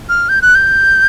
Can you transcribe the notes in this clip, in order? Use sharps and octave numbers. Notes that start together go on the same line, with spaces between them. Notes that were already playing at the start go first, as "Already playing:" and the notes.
F6
G6
F#6
G6